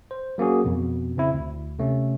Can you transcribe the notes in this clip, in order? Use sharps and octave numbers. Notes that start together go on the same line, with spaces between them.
C5
F#3 A#3 C#4 F#4 G#4
F2 B2
C#3 C4 E4
D2
C3 A3 C#4